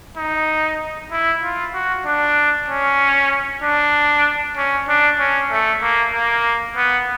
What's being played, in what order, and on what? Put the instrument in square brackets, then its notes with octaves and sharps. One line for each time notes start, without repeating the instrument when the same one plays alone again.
[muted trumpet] D#4
E4
F4
F#4
D4
C#4
D4
C#4
D4
C#4
A3
A#3
A#3
B3